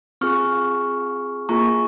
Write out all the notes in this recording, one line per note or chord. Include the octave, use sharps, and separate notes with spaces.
C4 F4 G#4 C#6 F6
A#3 F4 G#4 A#5 C#6